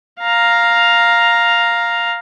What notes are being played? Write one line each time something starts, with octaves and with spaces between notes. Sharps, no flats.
F5 A#5